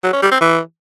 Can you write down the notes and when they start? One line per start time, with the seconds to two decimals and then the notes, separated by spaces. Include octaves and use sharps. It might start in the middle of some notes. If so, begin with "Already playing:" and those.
0.04 F#3
0.13 C#4
0.22 G3
0.31 C4
0.41 E3